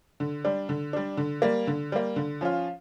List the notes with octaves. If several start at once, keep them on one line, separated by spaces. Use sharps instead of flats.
D3
G3 D4
D3
G3 D4
D3
G3 A#3
D3
G3 A#3
D3
F3 C#4 F4